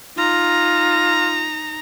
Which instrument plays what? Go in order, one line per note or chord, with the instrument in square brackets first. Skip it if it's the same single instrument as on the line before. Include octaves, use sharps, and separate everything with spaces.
[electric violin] D#4 A#5 [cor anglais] F4